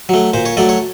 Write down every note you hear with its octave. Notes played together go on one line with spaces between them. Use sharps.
F#3 A3
A#2 C5
C#5
F#3 A3 D5
C#5